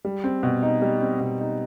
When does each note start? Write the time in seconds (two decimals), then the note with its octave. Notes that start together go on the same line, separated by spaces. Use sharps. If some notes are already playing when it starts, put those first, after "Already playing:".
0.05 G3
0.24 C4
0.43 B2
0.63 D#4
0.82 G3
1.01 C4
1.20 B2
1.40 D#4